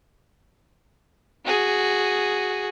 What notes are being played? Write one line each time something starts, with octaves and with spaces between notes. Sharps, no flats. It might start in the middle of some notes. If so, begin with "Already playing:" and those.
F#4 G#4